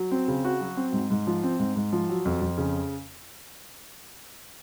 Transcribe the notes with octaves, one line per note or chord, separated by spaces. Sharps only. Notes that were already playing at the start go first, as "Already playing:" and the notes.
Already playing: F#3
C4
C#3
F#4
F#3
C4
G#2
G#2
F3
C4
G#2
G#2
F3
F#3
F2
F2
C#3